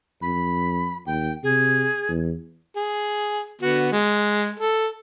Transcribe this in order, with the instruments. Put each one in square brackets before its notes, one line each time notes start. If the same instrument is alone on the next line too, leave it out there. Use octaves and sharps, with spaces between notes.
[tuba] F2 [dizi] B5
[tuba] D#2 [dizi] G5
[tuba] C3 [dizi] G#4
[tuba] E2
[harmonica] G#4
D3 B3 F#4
G#3
A4